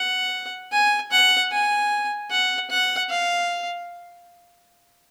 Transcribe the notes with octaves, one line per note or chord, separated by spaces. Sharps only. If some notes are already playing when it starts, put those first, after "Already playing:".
Already playing: F#5
G#5
F#5
G#5
F#5
F#5
F5